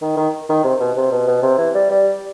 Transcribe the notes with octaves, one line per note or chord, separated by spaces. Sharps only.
D#3
D#3
D#3
C3
B2
C3
B2
B2
C3
E3
G3
G3